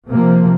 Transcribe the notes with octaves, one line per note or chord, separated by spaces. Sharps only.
C3 F3 A#3